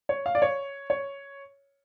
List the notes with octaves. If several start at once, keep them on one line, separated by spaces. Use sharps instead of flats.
C#5
F5
D5
C#5
C#5